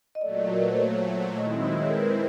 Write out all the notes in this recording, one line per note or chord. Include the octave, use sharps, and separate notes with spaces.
D#5
A#2 F#3 A3 D5
A#4
B4
C5
C#5
D#3 G#3 C4 E4 D#5
E5
D#5
C#5
A#4
B4
C5